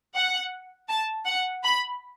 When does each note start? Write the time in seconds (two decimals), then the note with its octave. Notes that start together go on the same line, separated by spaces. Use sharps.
0.16 F#5
0.89 A5
1.26 F#5
1.64 B5